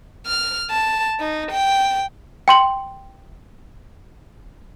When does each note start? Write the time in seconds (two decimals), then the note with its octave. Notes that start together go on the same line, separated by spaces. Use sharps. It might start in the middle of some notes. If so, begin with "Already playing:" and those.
0.26 F6
0.70 A5
1.20 D#4
1.51 G5
2.48 G5 C6 F#7